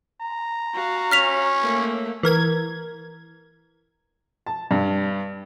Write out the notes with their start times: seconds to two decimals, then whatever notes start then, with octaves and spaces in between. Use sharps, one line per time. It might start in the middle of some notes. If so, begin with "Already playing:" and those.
0.21 A#5
0.74 F#4 F5
1.11 C#4 F6 B6 F7
1.61 A3 A#3
2.23 E3 A#4 G#6
4.46 A5
4.71 G2